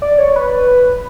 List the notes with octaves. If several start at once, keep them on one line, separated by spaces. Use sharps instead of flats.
D5
C#5
B4